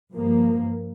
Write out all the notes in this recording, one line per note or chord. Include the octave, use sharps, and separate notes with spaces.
G2 F3 A#3